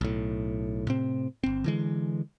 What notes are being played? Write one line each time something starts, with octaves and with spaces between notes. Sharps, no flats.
B1 A2
A2 C3 C4
G1 C4
D3 E3 G#3